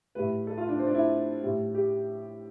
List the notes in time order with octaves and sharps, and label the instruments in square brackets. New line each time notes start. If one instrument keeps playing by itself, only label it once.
[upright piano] A2 G3 B4
A4
F4
D4
C4
D4
E4
A2 G3
G4